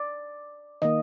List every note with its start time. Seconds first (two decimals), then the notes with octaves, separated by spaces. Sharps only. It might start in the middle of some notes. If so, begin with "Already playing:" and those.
Already playing: D5
0.82 D#3 A#3 D#5